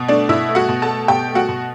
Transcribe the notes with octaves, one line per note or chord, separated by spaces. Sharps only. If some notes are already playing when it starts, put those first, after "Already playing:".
Already playing: B2
A3 D4 D5
B2 E4 E5
A3
F#4 F#5
B2
A4 A5
A3
B2 G4 G5
A3
F#4 F#5
B2